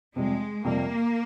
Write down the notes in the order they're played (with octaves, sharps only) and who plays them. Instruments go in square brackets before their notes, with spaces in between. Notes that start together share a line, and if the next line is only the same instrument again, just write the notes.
[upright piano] F2 C3 G3 [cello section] G#3
[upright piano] F2 C3 G3 [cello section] A#3